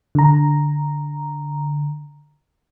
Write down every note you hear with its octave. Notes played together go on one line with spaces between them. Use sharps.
D3 A#5